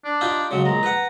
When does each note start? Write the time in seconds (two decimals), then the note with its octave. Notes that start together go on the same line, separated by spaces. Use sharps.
0.05 D4
0.21 D#4 F4 G4
0.51 C#3 F#3 G#3
0.65 A#1 G#3 A#5
0.83 B4 F#5